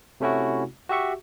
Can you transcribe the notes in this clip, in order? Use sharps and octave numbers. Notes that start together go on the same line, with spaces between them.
C3 A3 C#4 E4 F#4
F#4 G4 E5 C#6